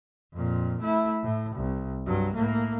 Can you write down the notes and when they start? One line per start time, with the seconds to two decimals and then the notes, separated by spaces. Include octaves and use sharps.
0.33 F2 A#2
0.80 A3 E4
1.23 A2
1.56 C2
2.06 G2 F#3
2.35 A2 A#3